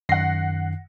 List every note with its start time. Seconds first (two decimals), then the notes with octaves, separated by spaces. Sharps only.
0.09 F#2 D#3 F#5 A#6 C7